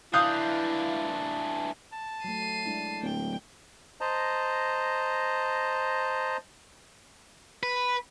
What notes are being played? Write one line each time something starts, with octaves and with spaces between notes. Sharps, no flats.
E3 D4 E4 F5 D#6 F#6 G6
A5
F#3 A3 C7 D#7
G#3 D4 E4
D1 G5
C5 D#5 A5 A#5
B4